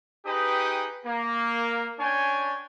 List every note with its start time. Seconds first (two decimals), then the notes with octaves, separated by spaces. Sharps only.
0.26 D#4 G4 G#4 B4 G5 D#6
1.05 A#3
1.99 C#4 D4 C#5 G5 G#5